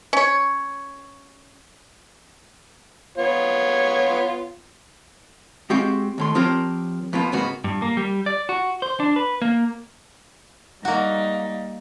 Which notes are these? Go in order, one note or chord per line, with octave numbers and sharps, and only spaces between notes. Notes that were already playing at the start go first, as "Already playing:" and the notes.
C#4 C#5
B3 F4 C#5
G#3 C4 F#4 G4 F5 G5
D#2 A2 C6
F3 C4 F4 G4 A#4 C#5
F2 B2 A#3 B3 F4
G#2 C#3 A#3 B3 F#4
G2
A#3
G3
D5
F#4
C5
D4
B4
A#3
G3 A#3 D#4 F#4